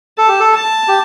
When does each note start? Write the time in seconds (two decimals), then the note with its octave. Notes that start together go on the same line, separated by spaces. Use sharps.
0.18 A4 A5
0.28 G4
0.40 A4
0.54 A5
0.88 G4